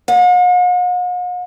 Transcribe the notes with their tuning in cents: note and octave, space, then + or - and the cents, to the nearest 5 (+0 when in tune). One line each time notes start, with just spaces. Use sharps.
F#5 -45